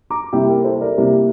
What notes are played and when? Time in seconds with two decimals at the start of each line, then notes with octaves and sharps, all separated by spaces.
0.10 A#5 D6
0.33 C3 G3 A#3 E4 E5 G5
0.49 A#4
0.65 A4 C5
0.81 A#4 D5
0.97 C3 G3 A#3 E4